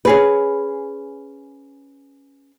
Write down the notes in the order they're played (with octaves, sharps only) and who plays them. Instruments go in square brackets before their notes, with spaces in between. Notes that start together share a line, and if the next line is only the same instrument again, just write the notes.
[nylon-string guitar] C#4 G#4 B4